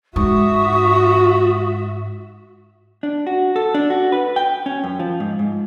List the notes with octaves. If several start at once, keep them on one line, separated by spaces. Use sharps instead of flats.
G#2 F#4 E5 C#6 D#6
D4
F#4
A4
D4
F#4
B4
G5
C#4
F#2
F3
G#2
G#2